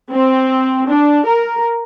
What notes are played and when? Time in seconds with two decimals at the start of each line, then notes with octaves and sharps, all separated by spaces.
0.10 C4
0.88 D4
1.27 A#4